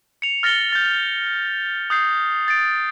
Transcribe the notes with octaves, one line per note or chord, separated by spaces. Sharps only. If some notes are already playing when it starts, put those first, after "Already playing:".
C#7 F7
F6 A6 A#6 C#7 G7
G6 A6
D#6 G6 C7
A6 D7